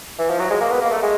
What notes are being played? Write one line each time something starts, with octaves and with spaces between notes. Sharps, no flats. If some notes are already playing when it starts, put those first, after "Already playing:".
E3
F3
F#3
G#3
A#3
B3
A#3
A3
G#3